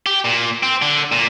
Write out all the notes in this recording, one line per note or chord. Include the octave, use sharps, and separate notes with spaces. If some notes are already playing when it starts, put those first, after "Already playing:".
G4
A#2
C4
D3
A#2